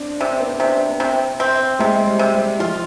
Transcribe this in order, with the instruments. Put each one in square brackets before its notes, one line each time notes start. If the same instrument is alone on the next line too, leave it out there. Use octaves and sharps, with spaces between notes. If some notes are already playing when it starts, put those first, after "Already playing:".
Already playing: [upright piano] C4 D4
[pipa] C3 [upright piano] D4
[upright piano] C4
B3
C4
[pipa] C3 [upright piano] D4
[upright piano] B3
[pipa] C3 [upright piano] C4
[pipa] C4
[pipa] C3 [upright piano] G#3
[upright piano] G3
[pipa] C3
[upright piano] G3
[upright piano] F3 [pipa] F4